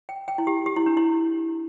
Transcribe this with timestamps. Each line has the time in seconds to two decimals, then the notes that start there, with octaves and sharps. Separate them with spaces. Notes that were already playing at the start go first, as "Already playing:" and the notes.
0.09 G5
0.28 G5
0.38 E4
0.47 G4
0.66 G4
0.76 E4
0.86 D4
0.97 E4